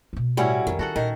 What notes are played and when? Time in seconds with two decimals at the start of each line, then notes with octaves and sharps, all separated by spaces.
0.13 B2 C4
0.37 A2 G3 C#4 E4 F#4
0.67 F2 D#3
0.79 D4 F#4 A4 F#5
0.96 A#2 D#3 A#4